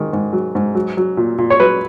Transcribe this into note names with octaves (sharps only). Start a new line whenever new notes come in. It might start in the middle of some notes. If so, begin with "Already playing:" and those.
Already playing: G#2 D#3
G#2
F#3
G#2
F#3
F#3
A#2
A#2
C#5
F#3 B4